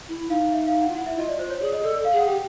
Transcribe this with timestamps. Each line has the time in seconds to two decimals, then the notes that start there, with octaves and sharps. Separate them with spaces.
0.08 E4
0.30 D#4 F5
0.52 E5
0.67 F5
0.81 F#5
0.88 F4
0.95 E4 F#5
1.06 E5
1.18 F4 D#5
1.29 D5
1.39 F4 C5
1.50 C#5
1.61 G#4 D5
1.73 D#5
1.83 A4 D5
1.94 D5
2.05 F5
2.12 G#4 F#5
2.27 G4 G5